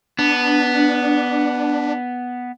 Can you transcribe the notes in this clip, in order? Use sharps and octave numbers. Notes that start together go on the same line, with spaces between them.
B3 D4